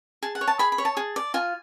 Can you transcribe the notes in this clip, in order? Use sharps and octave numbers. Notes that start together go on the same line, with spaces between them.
G#4 A5
F#5
C#5
A5
G#4 B5
B5
C#5
A5
G#4
D5
F4 G#5